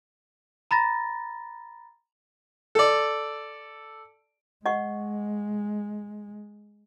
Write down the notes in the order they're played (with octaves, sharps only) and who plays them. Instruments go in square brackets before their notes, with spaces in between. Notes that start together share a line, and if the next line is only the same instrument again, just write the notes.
[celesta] A#5 B5 A6 A#6
[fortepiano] A4 D5
[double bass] G#3 [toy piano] D#5 F#5 C#6